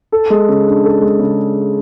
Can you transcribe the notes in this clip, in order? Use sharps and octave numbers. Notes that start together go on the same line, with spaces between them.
A4
G#3
C#3
D4
A4
G#3
C#3